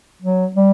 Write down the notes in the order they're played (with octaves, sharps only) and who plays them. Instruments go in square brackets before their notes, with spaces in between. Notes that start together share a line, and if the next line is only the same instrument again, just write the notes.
[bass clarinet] F#3
G3